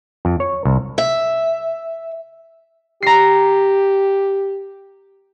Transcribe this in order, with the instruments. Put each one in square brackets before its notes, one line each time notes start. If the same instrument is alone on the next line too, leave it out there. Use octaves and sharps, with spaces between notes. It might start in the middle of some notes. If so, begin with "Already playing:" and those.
[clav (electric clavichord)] F2
C#5
C2
[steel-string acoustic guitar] E5
[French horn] G4 [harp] A#5 C7